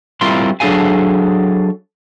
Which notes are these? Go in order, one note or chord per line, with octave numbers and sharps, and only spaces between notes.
G3 C4 E4 F4 A#4 C6
F#3 D4 G#4 A4 F5 G#5